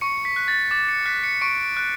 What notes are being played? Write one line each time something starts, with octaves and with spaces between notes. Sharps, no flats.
C#6 C#7
B6
F#6
A6
D6 A6
C#7
F#6 B6
C#7
C#6 D7
F#6